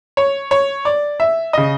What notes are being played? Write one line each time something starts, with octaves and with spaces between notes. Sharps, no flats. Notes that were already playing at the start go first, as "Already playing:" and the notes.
C#5
C#5
D5
E5
C#3 D#5